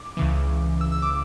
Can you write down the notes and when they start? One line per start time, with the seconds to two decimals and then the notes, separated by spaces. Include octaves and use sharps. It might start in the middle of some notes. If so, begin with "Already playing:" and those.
Already playing: D6
0.17 C#2 C#3 E3
0.81 E6
0.92 E6
1.02 D6